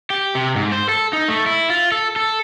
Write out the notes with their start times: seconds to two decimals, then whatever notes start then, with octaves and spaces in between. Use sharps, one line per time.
0.10 G4
0.35 C3
0.56 G#2
0.72 C5
0.89 A4
1.13 D#4
1.28 A3
1.46 E4
1.70 F4
1.92 A4
2.16 A4